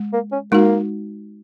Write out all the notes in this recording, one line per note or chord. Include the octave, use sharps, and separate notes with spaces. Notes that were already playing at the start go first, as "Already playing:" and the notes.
Already playing: G#3
A#3
C#4
G#3 A#3 D#4 F#4